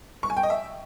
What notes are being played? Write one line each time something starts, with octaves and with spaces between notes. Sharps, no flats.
C#6
G#5
G5
D#5
E5